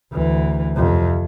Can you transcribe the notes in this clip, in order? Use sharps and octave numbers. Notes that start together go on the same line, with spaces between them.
D2 E3
F2 C3